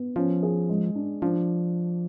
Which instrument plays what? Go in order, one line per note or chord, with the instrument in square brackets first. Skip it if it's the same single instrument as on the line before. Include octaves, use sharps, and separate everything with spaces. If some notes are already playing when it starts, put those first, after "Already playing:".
Already playing: [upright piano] B3
[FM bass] F3 [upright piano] C#4
[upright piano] G#4
G#3
D4
[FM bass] F3 [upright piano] D4